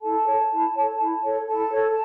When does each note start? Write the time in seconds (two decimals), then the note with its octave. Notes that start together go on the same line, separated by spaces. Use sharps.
0.02 E4 A4 A5
0.27 A4 C#5
0.51 E4
0.75 A4 C#5
1.00 E4
1.24 A4 C#5
1.48 E4 A4 A5
1.72 A4 C#5